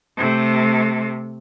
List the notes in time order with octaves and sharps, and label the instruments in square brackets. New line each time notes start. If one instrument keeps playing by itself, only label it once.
[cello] C3 A3